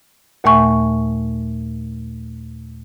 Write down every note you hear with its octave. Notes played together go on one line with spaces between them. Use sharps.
D#2 A#2 A3 E5 G#5 C#6